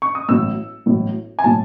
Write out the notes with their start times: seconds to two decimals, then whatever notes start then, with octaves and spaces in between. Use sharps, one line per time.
0.02 C#6
0.15 D#6
0.29 A1 A2 F#3 E6
0.86 A1 A2 F#3
1.39 G#5
1.44 A2 F#3 A5